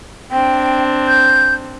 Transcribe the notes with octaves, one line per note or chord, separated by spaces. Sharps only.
C4 D4 G5
G6